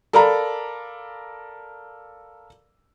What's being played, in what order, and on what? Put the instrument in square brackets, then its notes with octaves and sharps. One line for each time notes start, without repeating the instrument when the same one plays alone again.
[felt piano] A4 A#4 D5 F5 A#5 B5